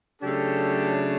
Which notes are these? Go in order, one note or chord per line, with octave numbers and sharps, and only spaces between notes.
C#3 F#3 A3 D4 G4 A4